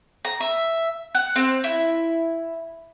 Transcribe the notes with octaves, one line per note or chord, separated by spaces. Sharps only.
A#5
E5
F#5
C4
E4